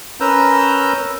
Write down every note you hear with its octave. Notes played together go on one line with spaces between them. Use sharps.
C#4 A#4 B4 A#5 E6 G6